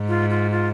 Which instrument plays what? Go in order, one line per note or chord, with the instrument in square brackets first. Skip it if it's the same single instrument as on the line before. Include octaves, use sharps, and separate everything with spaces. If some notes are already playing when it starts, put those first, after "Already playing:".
Already playing: [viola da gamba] G#2
[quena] F4
F4
F4